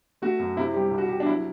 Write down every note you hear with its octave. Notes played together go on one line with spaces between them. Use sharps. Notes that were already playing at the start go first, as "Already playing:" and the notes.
A3 F#4
F#2
C3 E4
G3 G4
C2
F#4
C2 G4
D4
F#3 E4